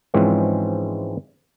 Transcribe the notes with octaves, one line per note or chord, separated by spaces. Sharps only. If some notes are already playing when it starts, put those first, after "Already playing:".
G#2 E3 F3 G#3 C4 C#4